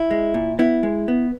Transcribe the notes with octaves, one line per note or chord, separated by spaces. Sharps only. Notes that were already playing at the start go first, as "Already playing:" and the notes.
Already playing: E4
G#3
A#2
B3 E4
G#3
B3